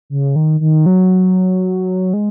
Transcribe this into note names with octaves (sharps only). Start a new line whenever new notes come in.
C#3
D#3
D#3
F#3
G#3